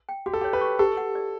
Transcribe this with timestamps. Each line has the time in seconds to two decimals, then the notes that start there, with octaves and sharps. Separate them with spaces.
0.09 G5
0.26 F#4 G4
0.33 A4
0.41 G4 C#5
0.53 B4
0.61 C#6
0.79 G4 A4
0.97 F#5
1.15 D5